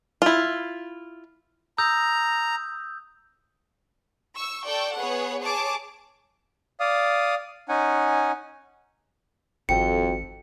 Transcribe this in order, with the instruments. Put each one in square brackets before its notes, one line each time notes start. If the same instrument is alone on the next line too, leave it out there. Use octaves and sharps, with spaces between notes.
[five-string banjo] E4 F4
[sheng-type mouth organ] A#5 [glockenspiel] D#6 E6 G6
[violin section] C#6 E6
A4 D5 G5 C#6
B3 G#4 C#5 F#5
G#4 C#5 A5 D6
[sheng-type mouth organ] D5 F5 D#6
C#4 D#4 F#5 G#5
[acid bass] G#1 [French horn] F2 [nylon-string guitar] F#4 A4 G5 [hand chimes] C#7